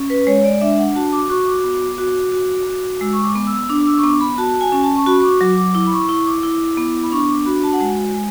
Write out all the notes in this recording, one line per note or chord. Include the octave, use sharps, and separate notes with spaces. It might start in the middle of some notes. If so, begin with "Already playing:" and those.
Already playing: C#4
B4
G#3 C#5
D5
D4 E5
F#5
F#4 A5
D6
F#4 C#6
D6
B3
F#4
F#4
F#4
G#3 E6
C#6
D6
B3
E6
D4 D6
D6
E6
C#6
B3 D6
B5
F#4 A5
G#5
C#4
A5
C#6
F#4 B5
C#6
D6
F#3 D6
D6
E4 D6
B5
C#6
E4 C#6
D6
E4
B3
B5
D4 C#6
D6
F#4 B5
A5
F#5
G#3 G#5
G#3